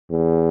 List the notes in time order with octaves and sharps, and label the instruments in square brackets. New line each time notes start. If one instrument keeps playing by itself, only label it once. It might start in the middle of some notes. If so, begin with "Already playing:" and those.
[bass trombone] E2